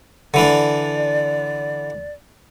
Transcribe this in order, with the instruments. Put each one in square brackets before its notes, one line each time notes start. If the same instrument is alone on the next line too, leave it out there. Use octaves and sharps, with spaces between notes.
[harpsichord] D3 E3 D4 [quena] D5